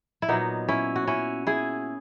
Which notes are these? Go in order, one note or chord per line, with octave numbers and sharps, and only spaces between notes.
E4
A#2 F#3 B3 D#4
C#4 E4
F#4
C#4 E4
E4 G#4